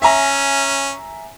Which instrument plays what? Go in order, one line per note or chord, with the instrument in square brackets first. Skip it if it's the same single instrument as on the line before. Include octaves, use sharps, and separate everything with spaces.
[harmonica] C#4 [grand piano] E5 G#5 A#5